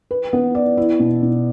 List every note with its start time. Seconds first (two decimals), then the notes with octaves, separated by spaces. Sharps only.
0.11 B4
0.33 B3
0.55 D5
0.77 E4
1.00 B2
1.22 B2